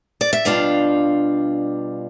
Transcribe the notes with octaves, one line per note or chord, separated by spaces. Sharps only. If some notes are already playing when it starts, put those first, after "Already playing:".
D5
E5
B2 G3 D4 F4 F5